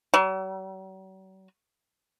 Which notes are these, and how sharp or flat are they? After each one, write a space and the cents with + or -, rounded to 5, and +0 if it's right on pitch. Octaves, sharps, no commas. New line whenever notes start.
F#3 +45